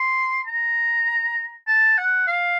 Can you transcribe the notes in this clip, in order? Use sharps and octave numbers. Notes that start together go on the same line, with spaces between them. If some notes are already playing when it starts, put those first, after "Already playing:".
Already playing: C6
A#5
A5
F#5
F5